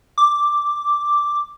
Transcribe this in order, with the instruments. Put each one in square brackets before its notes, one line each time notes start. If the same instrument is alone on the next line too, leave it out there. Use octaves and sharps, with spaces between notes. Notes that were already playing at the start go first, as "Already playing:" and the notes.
[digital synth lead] D6